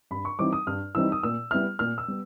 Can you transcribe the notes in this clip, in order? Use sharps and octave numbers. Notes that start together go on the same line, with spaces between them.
G2 B5
C#6
E3 G3 C4 D#4 D6
D#6
G2 F6
E3 G3 C4 D#4 E6
D#6
A#2 E6
G3 B3 E4 F6
A#2 F6
E6
G3 B3